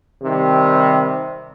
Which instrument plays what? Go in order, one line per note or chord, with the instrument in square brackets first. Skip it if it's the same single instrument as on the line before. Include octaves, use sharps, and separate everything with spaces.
[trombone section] C3 D#3 G3